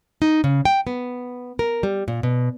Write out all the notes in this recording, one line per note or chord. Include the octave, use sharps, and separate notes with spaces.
D#4
C#3
G5
B3
A#4
G3
A#2
B2